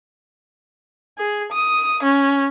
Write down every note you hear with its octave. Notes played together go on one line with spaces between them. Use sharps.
G#4
D#6
C#4